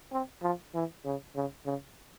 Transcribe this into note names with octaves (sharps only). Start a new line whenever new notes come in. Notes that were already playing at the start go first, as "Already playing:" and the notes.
C4
F3
E3
C#3
C#3
C#3